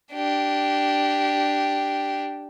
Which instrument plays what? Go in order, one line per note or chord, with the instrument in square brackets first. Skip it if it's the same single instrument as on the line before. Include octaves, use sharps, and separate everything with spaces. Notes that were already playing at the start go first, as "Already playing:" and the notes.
[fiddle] D4 G4